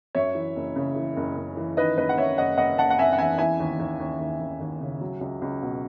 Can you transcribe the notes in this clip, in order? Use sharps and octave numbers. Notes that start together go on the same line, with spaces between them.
F#2 C#5 E5
E3
F#1
C#3
E3
F#1
F#1
E3
D#3 B4 D#5
F#1 B4 D#5
F#5
F#1 C#5 E5
F#1 D#5 F#5
F#1 D#5 F#5
F#1 F#5 A5
F#5
F#1 E5 G#5
F#5
E2 E5 G#5
E3 E5 G#5
D#2
D#2
D#2
D#2
D#2
D#2
C#3
F#3
C#2
C#2
B2